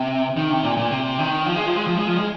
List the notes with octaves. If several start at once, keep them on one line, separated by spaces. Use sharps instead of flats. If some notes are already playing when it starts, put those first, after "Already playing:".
Already playing: C3
D#3
C3
A#2
A#2
C3
D#3
F3
G#3
F3
G#3
F3
G#3
F3
G#3